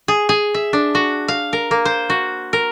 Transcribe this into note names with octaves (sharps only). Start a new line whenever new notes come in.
G#4
G#4
E5
D4
F#4
F5
A#4
A#3
C5
F#4
A#4